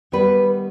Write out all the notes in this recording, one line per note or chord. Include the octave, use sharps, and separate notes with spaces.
D#3 G3 B3 B4